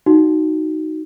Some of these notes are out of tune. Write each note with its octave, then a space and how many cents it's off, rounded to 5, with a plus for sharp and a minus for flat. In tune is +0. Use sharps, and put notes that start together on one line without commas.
D#4 +0 F#4 +10